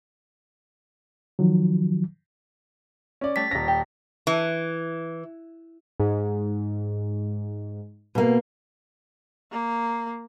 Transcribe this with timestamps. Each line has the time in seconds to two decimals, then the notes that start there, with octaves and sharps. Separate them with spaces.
1.39 D#3 F3 F#3
3.21 C#4 D5
3.36 G3 A3 A6 B6
3.51 D#1 C#4 A#6
3.68 G4
4.27 E3
6.00 G#2
8.15 B2 A#3
9.51 A#3